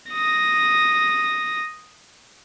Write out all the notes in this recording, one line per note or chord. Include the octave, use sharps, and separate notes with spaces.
D#6 A#6